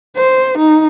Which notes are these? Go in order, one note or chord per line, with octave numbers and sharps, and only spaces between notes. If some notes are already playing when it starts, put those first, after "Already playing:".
C5
D#4